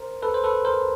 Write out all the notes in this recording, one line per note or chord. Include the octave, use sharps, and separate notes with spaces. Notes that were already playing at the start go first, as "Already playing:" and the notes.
Already playing: A#4 C5
A4 B4
C5
A4 B4
A#4 C5